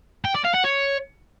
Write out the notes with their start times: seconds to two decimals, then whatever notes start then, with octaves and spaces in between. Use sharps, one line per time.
0.25 G5
0.34 D5
0.44 F5
0.54 F#5
0.64 C#5